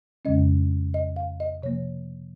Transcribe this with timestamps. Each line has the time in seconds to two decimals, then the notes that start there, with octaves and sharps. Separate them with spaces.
0.25 F2 C#3 G#3 C#4 D#5
0.94 D#5
1.16 F5
1.40 D#5
1.63 C3 F3 A#3 C#5